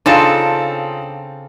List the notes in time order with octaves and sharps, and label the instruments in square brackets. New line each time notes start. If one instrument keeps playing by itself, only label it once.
[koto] C#3 C4 A4 [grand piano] D4 D#4 F4